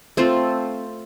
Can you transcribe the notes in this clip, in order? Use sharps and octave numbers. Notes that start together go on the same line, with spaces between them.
A3 C4 F4 A4